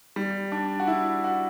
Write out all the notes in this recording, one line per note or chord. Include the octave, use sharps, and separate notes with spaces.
G3
D4
F#4
E4
F#4